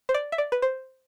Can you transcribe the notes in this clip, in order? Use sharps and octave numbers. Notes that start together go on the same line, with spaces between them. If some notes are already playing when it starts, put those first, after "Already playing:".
C5
D5
E5
D5
B4
C5